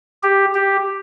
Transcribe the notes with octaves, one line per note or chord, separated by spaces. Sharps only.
G4
G4